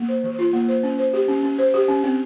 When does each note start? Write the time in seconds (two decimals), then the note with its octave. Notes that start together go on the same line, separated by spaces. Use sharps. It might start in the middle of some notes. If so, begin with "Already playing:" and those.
Already playing: A#3
0.08 C5
0.24 E3
0.39 F4
0.53 A#3
0.68 C5
0.83 C#4
0.99 C5
1.14 G4
1.28 C#4
1.43 C#4
1.58 C5
1.74 G4
1.88 C#4
2.04 C4